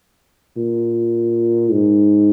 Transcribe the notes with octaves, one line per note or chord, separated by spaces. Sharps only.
A#2
G#2